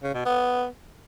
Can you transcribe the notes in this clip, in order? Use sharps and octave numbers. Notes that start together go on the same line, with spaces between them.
C#3
B2
B3